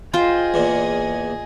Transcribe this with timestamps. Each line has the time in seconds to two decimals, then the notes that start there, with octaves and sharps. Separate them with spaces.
0.14 F4 G#4 C5 D#5 G5
0.54 E2 A#2